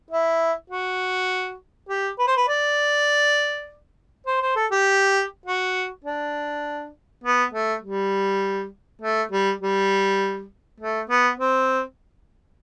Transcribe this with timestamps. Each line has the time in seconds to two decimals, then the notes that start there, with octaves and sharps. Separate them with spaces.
0.11 E4
0.70 F#4
1.89 G4
2.19 B4
2.27 C5
2.37 B4
2.49 D5
4.26 C5
4.41 C5
4.56 A4
4.71 G4
5.46 F#4
6.05 D4
7.24 B3
7.53 A3
7.83 G3
9.02 A3
9.32 G3
9.61 G3
10.80 A3
11.10 B3
11.39 C4